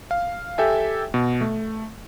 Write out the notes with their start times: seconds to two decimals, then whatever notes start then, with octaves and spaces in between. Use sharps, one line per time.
0.11 F5
0.58 G4 A4 E5 G5 G#5
1.14 B2
1.41 A3